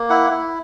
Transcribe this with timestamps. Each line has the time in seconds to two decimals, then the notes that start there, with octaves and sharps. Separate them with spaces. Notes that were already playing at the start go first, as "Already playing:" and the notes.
Already playing: A#3
0.10 E4 F#5
0.30 E4